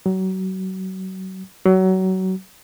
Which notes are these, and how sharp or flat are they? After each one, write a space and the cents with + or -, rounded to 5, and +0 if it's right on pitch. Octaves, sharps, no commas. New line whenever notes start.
F#3 +30
F#3 +25